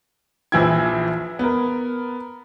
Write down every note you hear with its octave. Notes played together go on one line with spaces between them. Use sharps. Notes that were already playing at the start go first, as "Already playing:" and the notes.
A#1 E3 F3 E4 G5 G#6
B3 A#4